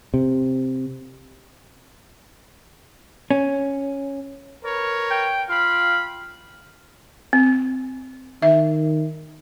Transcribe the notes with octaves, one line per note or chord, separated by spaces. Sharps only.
C3
C#4
A#4 B4 C#5
G5
F4 F5 G5 B5
C4
D#3 E5